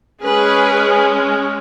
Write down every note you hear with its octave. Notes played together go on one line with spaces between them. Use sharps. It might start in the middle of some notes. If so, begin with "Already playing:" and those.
G#3 C#4 G#4 B4